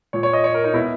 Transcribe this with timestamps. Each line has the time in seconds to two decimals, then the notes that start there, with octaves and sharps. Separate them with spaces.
0.13 A#2 C#5
0.23 C#5
0.33 D#5
0.44 C#5
0.54 A#4
0.64 D#4
0.74 B2 E4